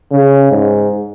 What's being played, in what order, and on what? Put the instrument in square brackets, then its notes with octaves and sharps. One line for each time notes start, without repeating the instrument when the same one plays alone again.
[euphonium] C#3
G#2